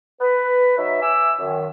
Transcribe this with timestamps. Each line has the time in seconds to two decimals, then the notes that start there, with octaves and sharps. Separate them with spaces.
0.20 B4
0.77 F#3 D#4 E5
1.01 E5 G#5 D6 E6
1.39 F#2 D#3